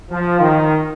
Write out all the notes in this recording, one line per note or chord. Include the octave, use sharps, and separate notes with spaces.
F3
D#3